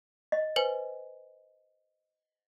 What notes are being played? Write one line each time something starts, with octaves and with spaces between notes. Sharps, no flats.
D#5
B4 C5 G#5